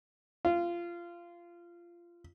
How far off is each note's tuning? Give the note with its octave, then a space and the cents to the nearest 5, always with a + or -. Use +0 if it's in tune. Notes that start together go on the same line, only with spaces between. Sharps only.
F4 -20